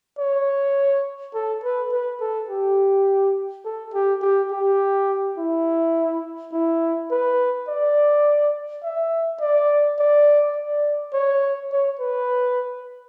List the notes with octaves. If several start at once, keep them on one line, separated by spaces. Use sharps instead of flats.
C#5
A4
B4
B4
A4
G4
A4
G4
G4
G4
E4
E4
B4
D5
E5
D5
D5
D5
C#5
C#5
B4